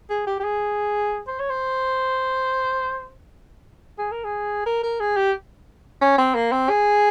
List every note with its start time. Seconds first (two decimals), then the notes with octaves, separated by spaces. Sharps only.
0.10 G#4
0.27 G4
0.40 G4
0.44 G#4
1.27 C5
1.39 C#5
1.50 C5
3.98 G#4
4.11 A#4
4.24 G#4
4.66 A#4
4.83 A#4
5.00 G#4
5.16 G4
6.01 C#4
6.18 C4
6.35 A#3
6.52 C4
6.69 G#4